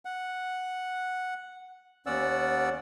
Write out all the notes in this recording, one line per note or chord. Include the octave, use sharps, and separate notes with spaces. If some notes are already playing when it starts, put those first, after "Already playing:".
F#5
D#2 B3 C#4 D5 F#5 E6